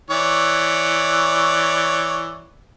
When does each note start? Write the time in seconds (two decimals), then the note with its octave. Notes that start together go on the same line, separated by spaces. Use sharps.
0.10 E3 C#5 D5